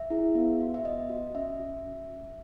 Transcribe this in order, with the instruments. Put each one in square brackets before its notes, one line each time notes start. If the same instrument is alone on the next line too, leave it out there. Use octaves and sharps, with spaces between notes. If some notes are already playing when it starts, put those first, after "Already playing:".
Already playing: [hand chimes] E5
E4 G#4
B3
F#4
E5
B3 D#5
F#4
C#4 E5
F#4
C#4
F#4